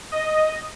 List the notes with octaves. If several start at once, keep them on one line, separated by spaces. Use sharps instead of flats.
D#5